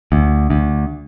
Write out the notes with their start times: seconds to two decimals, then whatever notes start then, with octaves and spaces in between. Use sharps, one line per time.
0.12 D2
0.50 D2